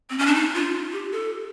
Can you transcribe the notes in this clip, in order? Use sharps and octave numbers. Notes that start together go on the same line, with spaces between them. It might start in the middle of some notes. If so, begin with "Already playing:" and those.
C4
C#4
D4
D#4
F4
G4
A4